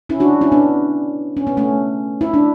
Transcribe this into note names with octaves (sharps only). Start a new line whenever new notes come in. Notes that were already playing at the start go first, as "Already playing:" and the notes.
C#4 E4
D4 F#4
C#4 E4
B3 D4
C#4
B3
A3 C#4
E4
D4